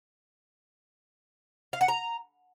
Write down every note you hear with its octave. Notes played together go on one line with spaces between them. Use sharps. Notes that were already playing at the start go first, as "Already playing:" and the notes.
F5
F#5
A#5